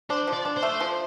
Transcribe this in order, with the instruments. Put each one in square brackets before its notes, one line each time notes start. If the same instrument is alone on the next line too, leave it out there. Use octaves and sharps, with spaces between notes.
[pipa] D4 [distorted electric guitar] C5
[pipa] F3
[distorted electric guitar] D5
[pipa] D4
[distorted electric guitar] C5
[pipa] A3
F3